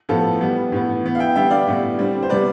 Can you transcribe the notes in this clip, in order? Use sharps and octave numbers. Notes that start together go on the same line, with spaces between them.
A2 F3 B3 F4 A4
E3 G3 B3
A2 E3 B3
E3 B3
F5
E5 G5
D3 G3 B3 E5 G5
D5 F5
A2 G3 B3
D3 G3 C4
C5
C3 G3 B3 B4 D5